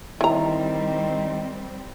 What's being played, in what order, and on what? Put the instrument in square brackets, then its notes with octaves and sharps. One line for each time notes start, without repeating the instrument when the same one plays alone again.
[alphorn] D#3 [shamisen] E3 A#5 [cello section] G3 C4